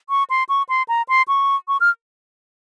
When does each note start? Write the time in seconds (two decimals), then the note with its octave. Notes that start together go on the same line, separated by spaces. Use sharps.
0.10 C#6
0.30 C6
0.49 C#6
0.69 C6
0.88 A#5
1.09 C6
1.28 C#6
1.68 C#6
1.81 F6